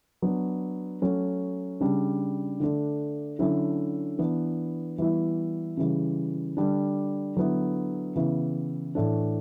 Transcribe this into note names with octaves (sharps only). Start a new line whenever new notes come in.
F#3 B3 D4
F#3 A3 C#4
C#3 G3 D4
D3 A3 D4
D3 F#3 C#4 E4
E3 B3 D4
E3 G3 B3 E4
C#3 E3 G3
D3 G3 D4
D3 F#3 B3 E4
C#3 E3 B3 E4
A2 E3 A3 D4